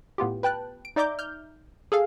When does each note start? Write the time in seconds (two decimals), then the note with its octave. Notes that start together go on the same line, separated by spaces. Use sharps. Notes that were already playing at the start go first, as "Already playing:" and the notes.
0.18 A2 B3 F4 G4
0.43 B4 G5 A5 F#6
0.85 D7
0.96 D#4 D5 E5 A#5 D6 G6
1.19 F6 G6
1.92 G#4 A4 F5